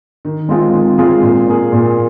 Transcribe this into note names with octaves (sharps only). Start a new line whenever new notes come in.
D#3
G#3 C4 F4 G#4
D#3
G#3 C4 F4 G#4
A#2
A#3 G#4
A#2